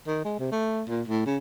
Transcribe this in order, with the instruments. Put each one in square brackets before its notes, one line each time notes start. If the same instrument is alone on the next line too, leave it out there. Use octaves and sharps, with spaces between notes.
[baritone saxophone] D#3
G#3
C3
A3
A#2
A2
C#3